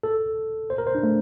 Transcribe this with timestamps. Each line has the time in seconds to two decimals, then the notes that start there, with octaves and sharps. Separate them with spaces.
0.03 A4
0.70 C5
0.78 A#4
0.87 C5
0.95 D4
1.03 A3